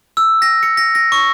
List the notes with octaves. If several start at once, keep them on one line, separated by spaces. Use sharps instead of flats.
E6
A#6
C#7
A#6
A#6
C#6